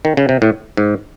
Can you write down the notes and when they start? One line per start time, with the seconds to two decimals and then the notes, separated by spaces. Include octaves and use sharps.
0.05 D#3
0.17 C#3
0.29 C3
0.42 A2
0.77 G#2